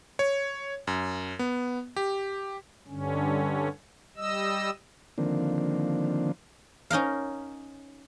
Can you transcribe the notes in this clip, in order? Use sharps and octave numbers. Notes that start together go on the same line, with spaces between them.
C#5
F#2
B3
G4
G2 D3 C#4
G3 D#5 E6
D3 D#3 F3 A#3 C4 D4
C#4 D#4 A#4 F5